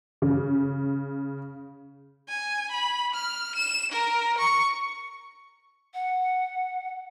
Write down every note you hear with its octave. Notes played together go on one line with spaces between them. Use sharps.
C#3
G#5
B5
F6
E7
A#4
C#6
F#5